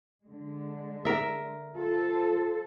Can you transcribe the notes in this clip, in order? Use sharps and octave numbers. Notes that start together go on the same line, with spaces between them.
D3 G#3
A#4 E5
F4 A4 C5